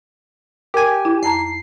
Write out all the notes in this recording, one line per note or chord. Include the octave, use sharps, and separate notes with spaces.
G4 A#4 G#5
E4
F2 A5 A#5 C7